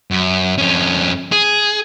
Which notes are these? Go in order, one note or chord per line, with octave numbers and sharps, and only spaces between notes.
F#2
F2 C#4
G#4